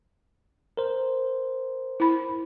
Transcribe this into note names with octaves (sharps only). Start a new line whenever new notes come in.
A#4 C5
E4 B5